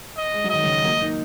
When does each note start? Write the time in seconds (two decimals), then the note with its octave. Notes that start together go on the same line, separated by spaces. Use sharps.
0.17 D#5
0.34 G#3
0.44 F#3
0.50 D#3 D#5
0.64 C#3 F#3
0.84 F#3 A#3
1.01 A#3 D#4